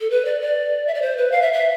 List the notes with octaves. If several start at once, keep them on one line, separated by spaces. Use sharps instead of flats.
A4
B4
D5
D5
E5
D5
C5
B4
F5
E5
E5